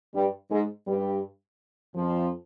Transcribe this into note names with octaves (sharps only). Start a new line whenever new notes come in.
G2 G3
G#2 G#3
G2 G3
F2 F3